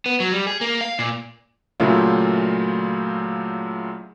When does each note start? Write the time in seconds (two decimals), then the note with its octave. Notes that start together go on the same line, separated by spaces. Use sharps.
0.06 B3
0.20 F#3
0.32 G3
0.47 G#4
0.61 A#3
0.81 F5
0.99 A#2
1.80 A#2 C#3 F#3 A3 E4 F4